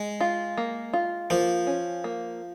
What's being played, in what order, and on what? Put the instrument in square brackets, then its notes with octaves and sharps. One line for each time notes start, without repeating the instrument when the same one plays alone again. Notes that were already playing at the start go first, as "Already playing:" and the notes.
Already playing: [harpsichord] G#3
[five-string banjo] F4
A#3
F4
[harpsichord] F3 [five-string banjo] A#3
[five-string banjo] C#4
A#3